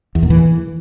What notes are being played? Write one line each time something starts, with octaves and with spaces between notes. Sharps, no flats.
E2
A#2
E3